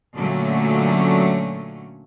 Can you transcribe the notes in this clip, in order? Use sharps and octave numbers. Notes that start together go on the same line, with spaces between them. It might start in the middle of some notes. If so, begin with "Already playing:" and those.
A#2 D3 F#3 A3 C#4